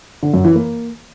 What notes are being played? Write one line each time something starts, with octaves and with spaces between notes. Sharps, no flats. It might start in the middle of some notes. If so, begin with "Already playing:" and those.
D3
F#2
E3
A#3